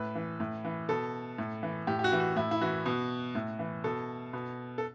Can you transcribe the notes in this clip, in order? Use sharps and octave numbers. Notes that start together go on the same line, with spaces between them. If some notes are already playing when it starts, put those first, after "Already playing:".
Already playing: A2 B4
E3
A2
E3
B2 A4
A2
E3
A2 G4
G4
F#4
E3
F#4
A2 E4
E4
E3 F#4
B2
A2
E3
B2 A4
B2
A4